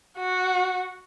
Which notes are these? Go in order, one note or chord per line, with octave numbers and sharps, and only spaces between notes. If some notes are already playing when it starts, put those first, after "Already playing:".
F#4